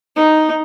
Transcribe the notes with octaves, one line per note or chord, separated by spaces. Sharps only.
D#4